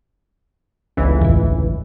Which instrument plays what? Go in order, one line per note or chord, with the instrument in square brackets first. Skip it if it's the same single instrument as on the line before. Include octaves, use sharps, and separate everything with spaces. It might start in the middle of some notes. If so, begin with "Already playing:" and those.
[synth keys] G1 C#2 E3
[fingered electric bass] A1 E2